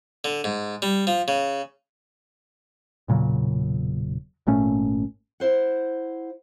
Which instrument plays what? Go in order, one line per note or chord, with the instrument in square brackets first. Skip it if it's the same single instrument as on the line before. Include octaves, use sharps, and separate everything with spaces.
[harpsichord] D3
G#2
G3
F3
C#3
[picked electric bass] E1 A#2 C#3 F#3
G#1 A#2 A3 C#4
[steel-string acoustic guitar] E4 C5 F#5